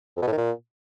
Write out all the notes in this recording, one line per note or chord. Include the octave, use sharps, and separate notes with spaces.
F2
B2
A2
D#3
A#2